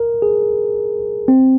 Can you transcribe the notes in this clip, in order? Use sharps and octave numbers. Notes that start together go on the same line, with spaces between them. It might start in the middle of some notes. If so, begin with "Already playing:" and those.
Already playing: A#4
G#4
C4